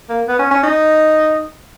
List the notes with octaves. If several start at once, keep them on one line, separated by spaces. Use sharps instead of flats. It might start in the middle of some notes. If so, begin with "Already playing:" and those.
A#3
B3
C#4
C#4
D#4